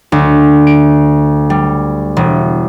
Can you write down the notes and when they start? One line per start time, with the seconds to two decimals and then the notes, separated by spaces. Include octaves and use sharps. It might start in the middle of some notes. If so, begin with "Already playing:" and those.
0.12 D2
0.67 D7
1.50 G3
2.17 E1